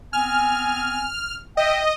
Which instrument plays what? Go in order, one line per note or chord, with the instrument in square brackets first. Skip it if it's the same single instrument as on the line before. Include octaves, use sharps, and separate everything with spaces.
[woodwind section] B3 C4 G#5 [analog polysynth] F6
[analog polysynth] D#5 [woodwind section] E5 G5